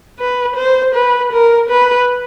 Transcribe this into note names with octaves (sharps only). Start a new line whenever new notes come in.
B4
C5
B4
A#4
B4